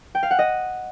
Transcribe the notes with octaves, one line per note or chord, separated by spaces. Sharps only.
G5
F5
F#5
D#5